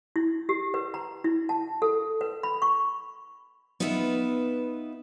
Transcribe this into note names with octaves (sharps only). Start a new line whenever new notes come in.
E4
G4
B4
A#5
E4
A5
A4
B4
B5
C#6
B3 D#4 F4 B4 E5